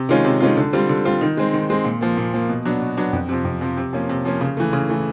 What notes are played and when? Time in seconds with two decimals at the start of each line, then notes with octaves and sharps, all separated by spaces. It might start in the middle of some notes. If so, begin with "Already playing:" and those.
Already playing: C3
0.09 D#3 G#3 C#4 F4
0.24 C3
0.40 D#3 G#3 C#4 F4
0.57 D3
0.73 G3 C4 F4
0.89 D3
1.05 G3 C4 F4
1.21 D#3
1.37 G#3 C4
1.53 D#3
1.70 G#3 C4
1.85 A#2
2.01 F3 A#3
2.17 A#2
2.34 F3 A#3
2.49 B2
2.65 F#3 B3 D4
2.81 B2
2.97 F#3 B3 D4
3.13 F2
3.29 C3 F3
3.45 F2
3.61 C3 F3
3.77 C3
3.93 F3 A#3 C#4
4.09 C3
4.25 F3 A#3 C#4
4.41 C#3
4.57 E3 A3
4.73 C#3
4.89 E3 A3